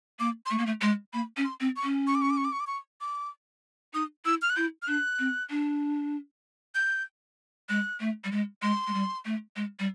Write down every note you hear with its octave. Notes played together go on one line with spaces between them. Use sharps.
A#3 D6
C6
A3 C#6
A#3
A3
G#3 C6
A#3 B5
C#4
C6
C4
C#6
C#4
C#6
D6
C#6
D6
C#6
D6
C#6
D6
C#6
D6
D#4 D#6
E4 E6
F6
F#6
E4 G6
F6
D4 F#6
C4
D4
G6
G#3 F#6
A3
G3
G#3
G#3 C6
G#3
G3
A3
G#3
G3